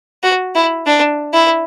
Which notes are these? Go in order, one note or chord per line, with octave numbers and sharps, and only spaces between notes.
F#4
E4
D4
E4